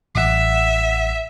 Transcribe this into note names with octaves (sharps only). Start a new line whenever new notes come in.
A1 E5 F#5